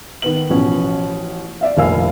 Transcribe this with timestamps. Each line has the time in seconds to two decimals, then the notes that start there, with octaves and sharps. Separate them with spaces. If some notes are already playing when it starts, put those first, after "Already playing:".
0.22 D#3 B3 F#7
0.50 A1 B2 F3 C#4
1.61 D5 E5 F5
1.77 F1 A#1 A#4 F5 G#5 E6